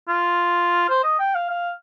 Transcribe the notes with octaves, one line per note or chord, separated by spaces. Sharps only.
F4
C5
D#5
G5
F5
F5